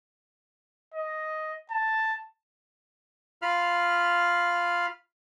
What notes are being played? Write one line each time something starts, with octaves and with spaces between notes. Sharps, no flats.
D#5
A5
F4 F5 B5 F6